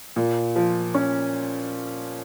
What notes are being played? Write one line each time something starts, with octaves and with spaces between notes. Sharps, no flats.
A#2
F3
C#4